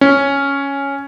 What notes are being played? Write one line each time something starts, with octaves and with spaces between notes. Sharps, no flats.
C#4